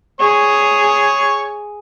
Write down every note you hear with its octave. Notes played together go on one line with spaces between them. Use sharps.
G#4 C#5